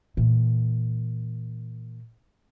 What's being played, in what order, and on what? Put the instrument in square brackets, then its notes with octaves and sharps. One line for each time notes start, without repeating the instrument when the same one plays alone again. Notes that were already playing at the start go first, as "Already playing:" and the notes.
[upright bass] A#2 E3